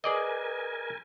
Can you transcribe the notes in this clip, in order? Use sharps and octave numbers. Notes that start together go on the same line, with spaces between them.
G#4 A#4 B4 D5 D#5 G#5